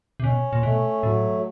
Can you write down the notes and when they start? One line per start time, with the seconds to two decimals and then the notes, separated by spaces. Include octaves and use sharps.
0.20 C3
0.23 B2 C#4
0.53 A#2
0.63 B2 A3
1.03 A2 F#3